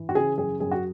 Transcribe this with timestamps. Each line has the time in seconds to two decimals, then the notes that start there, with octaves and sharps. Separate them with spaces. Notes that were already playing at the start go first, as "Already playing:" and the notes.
Already playing: E3
0.09 F#4
0.15 C#3 G#4
0.37 F#2 G#4
0.60 F#2 G#4
0.71 F#4